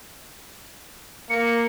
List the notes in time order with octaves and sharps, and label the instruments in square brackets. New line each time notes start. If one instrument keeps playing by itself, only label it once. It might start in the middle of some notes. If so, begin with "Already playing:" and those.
[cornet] A#3 [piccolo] C#7